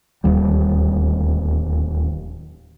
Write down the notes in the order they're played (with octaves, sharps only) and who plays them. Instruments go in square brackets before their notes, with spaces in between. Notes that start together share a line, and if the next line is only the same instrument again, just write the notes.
[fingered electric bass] D1 D#2 G3